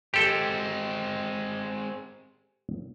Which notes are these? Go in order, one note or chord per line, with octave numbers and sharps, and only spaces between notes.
G#3 C4 G4 A4 G5